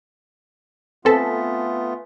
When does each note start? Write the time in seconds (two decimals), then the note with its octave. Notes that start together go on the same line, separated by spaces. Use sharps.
1.05 A3 B3 C4 F4 A4 B4 G#5 B6